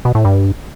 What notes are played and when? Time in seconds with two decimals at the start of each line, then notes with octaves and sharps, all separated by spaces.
0.05 B2
0.15 A2
0.25 G2